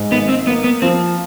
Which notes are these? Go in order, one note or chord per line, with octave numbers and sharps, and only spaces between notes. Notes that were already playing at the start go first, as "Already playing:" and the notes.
Already playing: G#2
G#1 B3
C4
A#3 B3
B3
F3 C4